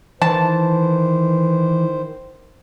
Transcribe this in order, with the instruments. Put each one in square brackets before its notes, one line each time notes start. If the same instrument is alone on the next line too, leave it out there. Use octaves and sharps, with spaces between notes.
[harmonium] D#3 C5 [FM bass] E3 [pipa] A5